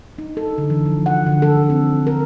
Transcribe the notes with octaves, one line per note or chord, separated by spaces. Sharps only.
D#4
A4
D3
E3
F3
F#5
D3
A4
C4
A#4